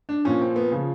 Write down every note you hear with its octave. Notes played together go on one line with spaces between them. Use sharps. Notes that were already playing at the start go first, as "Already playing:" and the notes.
D4
A#2 F3 C#4
C4
B3
C#3 F3